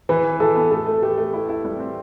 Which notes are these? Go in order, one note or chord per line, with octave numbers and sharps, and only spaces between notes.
E3 B4
E3
E3 A4
B3
A3 A4
A3
A3 G4
A3
E4
E4
G3
C4